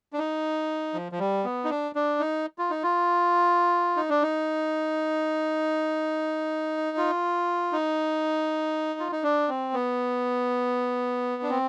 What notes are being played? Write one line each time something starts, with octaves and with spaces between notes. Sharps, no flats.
D4
D#4
F3
F3
G3
B3
D#4
D4
D4
D#4
F4
D#4
F4
D#4
D4
D#4
F4
D#4
F4
D#4
D4
C4
B3
D4
C4